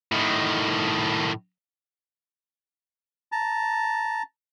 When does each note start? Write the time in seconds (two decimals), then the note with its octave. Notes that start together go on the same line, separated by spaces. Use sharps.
0.12 A2 D#3
3.32 A5 A#5